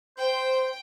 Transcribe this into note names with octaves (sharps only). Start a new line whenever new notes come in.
C5 G5